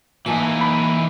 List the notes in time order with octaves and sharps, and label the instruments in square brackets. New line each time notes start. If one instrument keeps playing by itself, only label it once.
[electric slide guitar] E3 D#4 [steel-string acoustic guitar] A#3 G#5 A5
[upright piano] B5